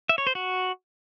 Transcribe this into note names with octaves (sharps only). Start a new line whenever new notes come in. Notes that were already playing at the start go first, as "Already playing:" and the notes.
E5
C#5
C5
F#4